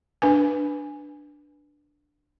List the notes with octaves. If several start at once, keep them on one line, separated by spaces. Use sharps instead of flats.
D4 B4 G#5